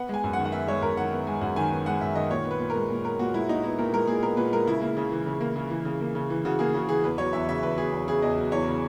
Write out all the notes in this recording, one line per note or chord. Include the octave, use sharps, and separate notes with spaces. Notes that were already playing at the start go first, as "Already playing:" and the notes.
Already playing: B3 F#5
G#3 G#5
F#2
F#5
D#3
F#5
B3 E5
G#3 C#5
F#2 A#4
D#3 F#5
B3
G#3 G#5
F#2 F#5
D#3 G#5
B3
G#3 F#5
F#2 E5
D#3 D#5
A#2 C#5
B3
B4
A#2
A#4
G#3
A#2
B3 A#4
A#2 F#4
G#3 E4
A#2 D#4
B3 E4
A#2 A#4
G#3 A#4
A#2 G#4
B3 A#4
A#2 B4
G#3 A#4
C#3 E4
A#3
C#3
E3
C#3
A#3
C#3
E3
C#3
A#3
C#3
E3
C#3 F#4
A#3 G#4
C#3 F#4
E3 G#4
E2 B4
F#3 C#5
E2 E5
C#3 E5
E2 B4
F#3 G#4
E2
C#3 G#4
E2 D#5
F#3
E2 C#5
C#3